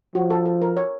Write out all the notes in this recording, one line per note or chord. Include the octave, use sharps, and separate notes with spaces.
F3 F#4
A4
A4
A#4
C#5